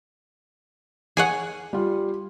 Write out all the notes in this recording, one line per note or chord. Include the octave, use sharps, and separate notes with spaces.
G#4 C#5 F#5
G3 F4